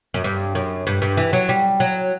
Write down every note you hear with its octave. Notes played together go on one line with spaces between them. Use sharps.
F#2
G2
F#2
G2
G2
E3
F#3
G3
F#3